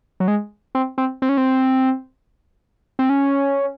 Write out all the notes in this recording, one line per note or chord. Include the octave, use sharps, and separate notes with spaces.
F#3
G#3
C4
C4
C4
C#4
C4
C4
C#4